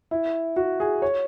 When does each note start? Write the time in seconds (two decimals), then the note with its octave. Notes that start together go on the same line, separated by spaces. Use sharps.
0.11 E4
0.56 F#4
0.80 G#4
1.02 C#5